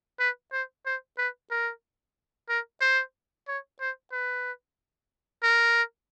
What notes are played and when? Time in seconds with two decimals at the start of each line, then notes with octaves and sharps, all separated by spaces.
0.20 B4
0.52 C5
0.86 C5
1.18 B4
1.51 A#4
2.49 A#4
2.81 C5
3.48 C#5
3.81 C5
4.12 B4
5.43 A#4